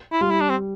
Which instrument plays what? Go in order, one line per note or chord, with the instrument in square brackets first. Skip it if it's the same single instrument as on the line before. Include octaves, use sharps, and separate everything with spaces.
[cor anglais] E4
[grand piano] G3 [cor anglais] F4
[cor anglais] E4
D4
C4